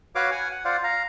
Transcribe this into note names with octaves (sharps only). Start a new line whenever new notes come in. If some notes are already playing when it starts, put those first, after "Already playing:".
F#4 B4 C#5 F5 D6
F#5 G#5
F#5
F4 C5 D5 F5 F#5
F5 A#5